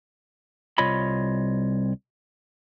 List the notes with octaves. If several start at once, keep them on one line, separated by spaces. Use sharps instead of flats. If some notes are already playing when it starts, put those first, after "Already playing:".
C2 F4 C#5 D#5 B5